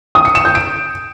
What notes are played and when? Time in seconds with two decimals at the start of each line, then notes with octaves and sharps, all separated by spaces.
0.15 D#6
0.25 C#7
0.35 E7
0.45 G6
0.55 D7